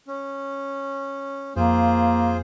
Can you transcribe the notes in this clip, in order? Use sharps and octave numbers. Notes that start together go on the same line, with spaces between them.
C#4
F2 A#3 F4 G#4 C5